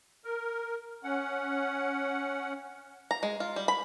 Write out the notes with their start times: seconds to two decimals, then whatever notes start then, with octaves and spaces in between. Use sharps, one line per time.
0.25 A#4
1.03 C#4 F#5
3.11 A#5
3.23 G#3
3.40 F4
3.56 G3
3.68 B5